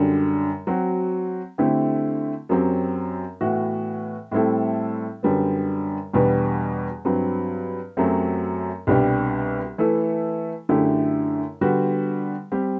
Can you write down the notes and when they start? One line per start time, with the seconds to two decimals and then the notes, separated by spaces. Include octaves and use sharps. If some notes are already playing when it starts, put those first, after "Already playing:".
Already playing: F#2 D3 G3 D4
0.67 F#3 C4 F#4
1.58 D3 A3 C4 E4 G4
2.49 F#2 F#3 C4 G4
3.41 A2 E3 B3 F#4
4.32 A2 G3 C4 E4 A4
5.23 F#2 D3 G3 B3
6.14 E2 B2 G3 B3 D4
7.05 G2 F#3 C4
7.97 F#2 F#3 A3 C4 G4
8.87 C2 B2 G3 D4 G4
9.78 E3 A3 E4 A4
10.69 F#2 D3 A3 E4 G4
11.61 D3 G3 B3 F#4
12.52 G3 C4 G4